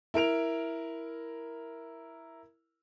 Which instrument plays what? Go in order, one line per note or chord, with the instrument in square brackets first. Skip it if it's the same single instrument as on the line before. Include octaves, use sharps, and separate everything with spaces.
[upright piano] E4 A#4 D7 F7